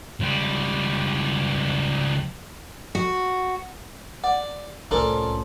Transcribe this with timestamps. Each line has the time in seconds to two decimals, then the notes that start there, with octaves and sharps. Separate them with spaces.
0.20 C#2 G3
2.95 F#4
4.24 D5 F#5
4.91 C2 A2 F3 C#4 D4 A4 A#4